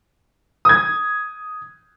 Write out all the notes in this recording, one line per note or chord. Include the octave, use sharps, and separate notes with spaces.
D#6 G#6